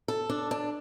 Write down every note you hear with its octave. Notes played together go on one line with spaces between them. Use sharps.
A4
D4
D4